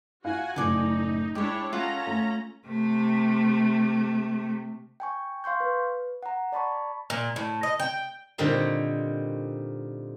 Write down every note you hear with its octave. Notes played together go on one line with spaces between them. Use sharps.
E4 F#4 F5 F#5 G#5
F#1 A2 D#4 A4 D5 G#5
G#3 D4 E4 G4 C#5 B5
C#4 F4 A4 F#5 A#5
A3
C3 A3
G5 G#5 C#6
F5 C6 C#6 G6
B4
F#5 A#5
D5 A5 B5 C#6
A#2
A2
D#5
G5
A#2 D3 G3 C4 D#4